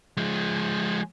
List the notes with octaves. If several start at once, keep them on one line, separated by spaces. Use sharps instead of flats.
F3 G#3